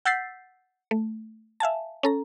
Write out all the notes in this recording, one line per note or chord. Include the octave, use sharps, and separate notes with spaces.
F#5 E6 G6 A6 B6 C7
A3
E5 F5 G#5 A5
C#4 A4 A#5